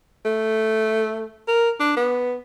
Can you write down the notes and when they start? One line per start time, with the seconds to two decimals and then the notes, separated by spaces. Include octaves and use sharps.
0.25 A3
1.48 A#4
1.80 D4
1.97 B3